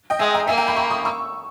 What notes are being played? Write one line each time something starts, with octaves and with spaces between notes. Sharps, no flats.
D#5 G5
G#3 E5 G#5
G5 A#5
A#3 E5 G#5
G5 A#5
G#5 B5
A#5 C#6
B5 D#6
C#6 E6